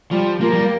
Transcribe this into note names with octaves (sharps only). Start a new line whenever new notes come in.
F3 G3
F3 A#3
G3